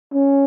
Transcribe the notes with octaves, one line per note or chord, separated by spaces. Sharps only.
C#4